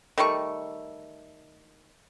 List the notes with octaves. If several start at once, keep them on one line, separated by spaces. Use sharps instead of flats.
D#3 G3 A3 C#6